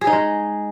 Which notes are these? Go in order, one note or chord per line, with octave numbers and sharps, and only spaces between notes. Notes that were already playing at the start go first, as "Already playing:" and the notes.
G#4
D#4
G#3